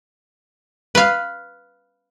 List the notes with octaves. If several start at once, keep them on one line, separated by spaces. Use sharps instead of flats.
B4 F5